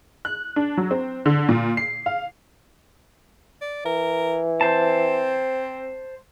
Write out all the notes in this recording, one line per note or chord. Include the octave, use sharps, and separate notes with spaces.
F#6
D4
F#3
C4
D3
A#2
C7
F5
D5
E3 A#4
C4 C5 A5